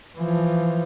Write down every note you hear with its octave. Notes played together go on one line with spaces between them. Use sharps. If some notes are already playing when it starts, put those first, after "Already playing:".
E3 F3